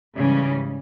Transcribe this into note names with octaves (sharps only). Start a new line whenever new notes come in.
G#2 C#3 E3 G3 C#4